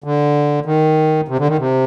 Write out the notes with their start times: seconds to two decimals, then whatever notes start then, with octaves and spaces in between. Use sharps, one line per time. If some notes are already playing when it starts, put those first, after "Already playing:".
0.04 D3
0.65 D#3
1.28 C3
1.39 D3
1.48 D#3
1.58 C3